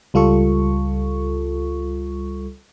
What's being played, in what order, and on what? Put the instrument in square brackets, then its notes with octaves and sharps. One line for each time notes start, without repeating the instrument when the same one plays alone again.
[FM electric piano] C#2 G3 F4 A4 C#6